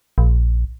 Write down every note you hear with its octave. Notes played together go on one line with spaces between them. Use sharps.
A#1